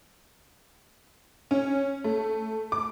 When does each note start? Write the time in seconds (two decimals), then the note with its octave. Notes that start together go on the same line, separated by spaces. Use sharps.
1.51 C#4
2.04 A3
2.72 D6